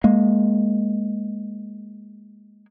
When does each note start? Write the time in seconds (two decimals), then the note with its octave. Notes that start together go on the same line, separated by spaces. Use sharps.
0.04 G#3 A#3